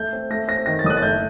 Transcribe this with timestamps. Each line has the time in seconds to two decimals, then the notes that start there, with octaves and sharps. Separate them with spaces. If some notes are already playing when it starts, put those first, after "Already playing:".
Already playing: A3 G6
0.13 C4
0.30 A3 A#6
0.48 C4 A#6
0.66 D#3 A#6
0.79 A6
0.84 F#1 D#6
0.90 F#6
0.97 A6
1.03 A3 G6